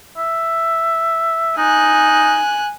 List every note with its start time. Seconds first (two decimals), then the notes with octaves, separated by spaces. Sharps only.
0.17 E5
1.57 D#4 G#5 F#6